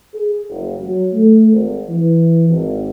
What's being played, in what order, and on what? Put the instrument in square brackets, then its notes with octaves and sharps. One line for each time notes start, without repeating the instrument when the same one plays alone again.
[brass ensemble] G#4
F#1
F#3
A3
G#1
E3
G#1